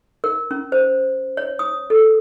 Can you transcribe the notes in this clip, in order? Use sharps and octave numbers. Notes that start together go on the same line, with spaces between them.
A#4
C#4
C5
C#5
D#6
A4